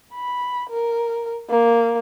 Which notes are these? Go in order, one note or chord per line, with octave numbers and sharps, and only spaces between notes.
B5
A#4
A#3